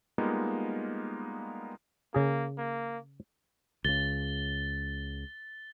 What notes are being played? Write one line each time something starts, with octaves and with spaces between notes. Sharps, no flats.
G3 G#3 A#3 B3 D#4 F4
C#3 A#3 G#4
A#3
C#2 C#3 A6 G7